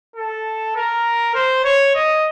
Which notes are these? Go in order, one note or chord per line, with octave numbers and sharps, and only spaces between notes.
A4
A#4
C5
C#5
D#5